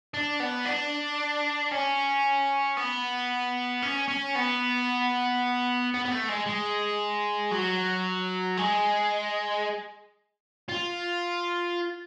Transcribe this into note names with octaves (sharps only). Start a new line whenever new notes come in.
D4
B3
D4
C#4
B3
C#4
C#4
B3
B3
B3
A3
G#3
G#3
F#3
G#3
F4